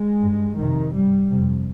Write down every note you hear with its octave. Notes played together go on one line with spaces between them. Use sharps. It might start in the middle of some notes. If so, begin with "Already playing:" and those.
Already playing: G#3
G2
F2 C3 D#3
G2 G3
F2 C3